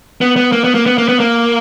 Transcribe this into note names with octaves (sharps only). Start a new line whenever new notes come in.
B3
B3
A#3
B3
A#3
B3
A#3
B3
A#3